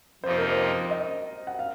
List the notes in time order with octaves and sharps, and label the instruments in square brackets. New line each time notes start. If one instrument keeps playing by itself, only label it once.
[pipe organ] F2 C3 F3 A#3 D#4 [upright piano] C5
[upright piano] A#4
C5
D#5
F#5
F5